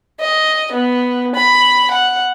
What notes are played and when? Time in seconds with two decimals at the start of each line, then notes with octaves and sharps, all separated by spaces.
0.20 D#5
0.72 B3
1.35 B5
1.90 F#5